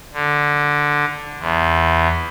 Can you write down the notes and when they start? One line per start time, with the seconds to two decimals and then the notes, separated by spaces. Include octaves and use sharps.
0.13 D3
1.39 E2